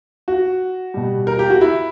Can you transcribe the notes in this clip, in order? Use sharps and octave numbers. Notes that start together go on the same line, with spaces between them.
F#4
B2 G3
A#4
G4
F#4
E4